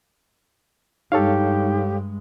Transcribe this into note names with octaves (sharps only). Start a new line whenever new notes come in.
G2 G#3 D#4 G4 A4 C#5 F5